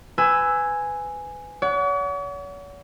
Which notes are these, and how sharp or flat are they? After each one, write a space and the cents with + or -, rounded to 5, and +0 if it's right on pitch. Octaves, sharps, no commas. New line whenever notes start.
B4 +25 G#5 +0 E6 +0
C#5 +45 F#5 +0